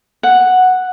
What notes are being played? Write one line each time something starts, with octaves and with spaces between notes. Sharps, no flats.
F#5